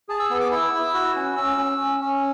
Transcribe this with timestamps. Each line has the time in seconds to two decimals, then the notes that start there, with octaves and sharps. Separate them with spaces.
0.09 G#4 A5
0.20 E6
0.30 B3 E6
0.41 D6
0.51 E4 E6
0.73 E4
0.94 F#4
1.15 C#4
1.37 C#4 E6
1.58 C#4
1.79 C#4
2.01 C#4